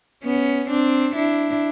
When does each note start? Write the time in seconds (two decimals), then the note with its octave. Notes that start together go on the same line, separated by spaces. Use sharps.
0.23 B3 C#4
0.70 C4 D4
1.16 D4 E4